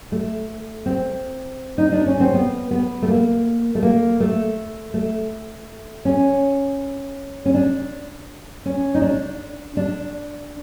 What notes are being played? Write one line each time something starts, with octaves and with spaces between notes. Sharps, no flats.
A3
C4
D#4
D4
C#4
C4
B3
B3
A3
A#3
A3
A#3
A3
A3
C#4
C#4
D4
C#4
D#4
D4
D4